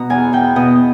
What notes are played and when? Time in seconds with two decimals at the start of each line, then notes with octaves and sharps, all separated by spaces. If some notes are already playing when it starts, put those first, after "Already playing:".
Already playing: B2 A#5
0.10 E2 G#5
0.33 E2 G5
0.56 B2 D#5